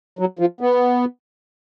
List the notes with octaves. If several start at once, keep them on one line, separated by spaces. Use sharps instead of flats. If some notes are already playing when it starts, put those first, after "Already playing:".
F#3
F3
B3